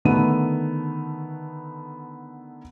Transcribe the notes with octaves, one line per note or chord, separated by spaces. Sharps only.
D3 D#3 A3 B3 D#7